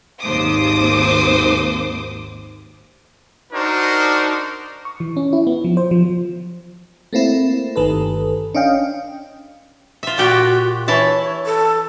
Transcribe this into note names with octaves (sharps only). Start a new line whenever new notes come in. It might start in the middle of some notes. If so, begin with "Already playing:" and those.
G#1 D#2 C5 D6 D#6
D4 D#4 F#4 A#4 C5
C#6
E3
C#4
E4
B3
F3
C5
F3
A3 A#3 C4 E4
G1 D#3 A4 B4
C#4 D4 D#5 F5 G5
F4 E5
A#2 F#4 G4 G5
E3 E4 C#5 A5
A4